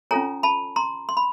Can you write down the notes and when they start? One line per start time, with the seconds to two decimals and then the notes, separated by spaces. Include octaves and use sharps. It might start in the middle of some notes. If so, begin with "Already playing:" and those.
0.11 C#4 F4 A4 C#5 G#5 A#5
0.43 A5 B5
0.76 A#5 C6
1.09 C6
1.17 B5